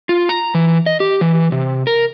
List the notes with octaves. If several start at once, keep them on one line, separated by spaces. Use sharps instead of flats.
F4
A#5
E3
D#5
G4
E3
C3
A#4